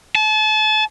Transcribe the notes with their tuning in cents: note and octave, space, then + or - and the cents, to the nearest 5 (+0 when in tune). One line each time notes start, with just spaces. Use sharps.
A5 -35